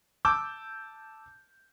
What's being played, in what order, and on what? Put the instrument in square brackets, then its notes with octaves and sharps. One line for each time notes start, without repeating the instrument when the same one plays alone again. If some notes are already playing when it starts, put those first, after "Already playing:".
[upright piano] A5 D6 E6 G6